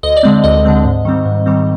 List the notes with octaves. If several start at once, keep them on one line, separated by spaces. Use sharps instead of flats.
D2 D#5
D5
D3 G#3 C4
D2 D#5
D3 G#3 C4
G#2
D#3 G3 C4
G#2
D#3 G3 C4